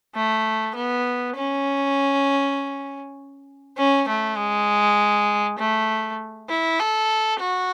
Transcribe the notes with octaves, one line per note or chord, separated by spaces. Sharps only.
A3
B3
C#4
C#4
A3
G#3
A3
E4
A4
F#4